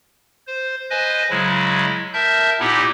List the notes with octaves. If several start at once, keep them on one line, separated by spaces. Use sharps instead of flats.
C5
B4 C5 D#5 G#5
C#3 F#3 G#3 E4
A#4 E5 A5 G6
A#2 B3 D#4 E4 G4